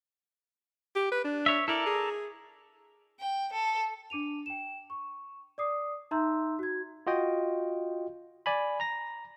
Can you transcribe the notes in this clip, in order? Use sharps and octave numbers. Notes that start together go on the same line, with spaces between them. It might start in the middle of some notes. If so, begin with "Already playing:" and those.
G4
B4
D4
C#5 E5
E4 A4 A#4 D5
G#4
G5
A4
D4 D6 D#7 F7
G5 E7
C#6
D5 D6 D#6 C7
D#4 E5 A#5 C6 E6 G6
F#4 G#6
F4 F#4 D#5 G5
D5 G#5 B5
A#5 A#6